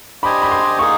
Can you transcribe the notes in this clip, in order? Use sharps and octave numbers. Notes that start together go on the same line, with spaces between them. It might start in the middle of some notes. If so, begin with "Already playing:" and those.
D4 G4 C5 D#5 G#5 B5
B5
C6
A#3 D#4 G#4 C#6